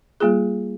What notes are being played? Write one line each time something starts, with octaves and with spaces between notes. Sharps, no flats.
G3 A#3 F4 G#4